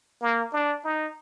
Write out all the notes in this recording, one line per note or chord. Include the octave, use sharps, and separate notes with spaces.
A#3
D4
D#4